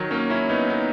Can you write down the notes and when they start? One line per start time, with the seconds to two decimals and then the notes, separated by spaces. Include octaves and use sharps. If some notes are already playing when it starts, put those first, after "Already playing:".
Already playing: D#3 F#3
0.11 A#3 C#4
0.30 C#4 E4
0.49 B3 D#4
0.69 B3 D#4